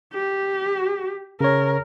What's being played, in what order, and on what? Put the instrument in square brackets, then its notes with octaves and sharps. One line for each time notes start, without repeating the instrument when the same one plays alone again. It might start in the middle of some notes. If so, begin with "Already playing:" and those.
[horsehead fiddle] G4
[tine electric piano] C#3 C#5 [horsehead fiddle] A#4